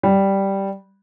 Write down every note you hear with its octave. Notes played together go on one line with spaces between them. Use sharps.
G3